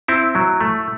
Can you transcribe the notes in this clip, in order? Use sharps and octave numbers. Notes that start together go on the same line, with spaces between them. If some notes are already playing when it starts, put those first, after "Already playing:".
C4 E4
F#3
A3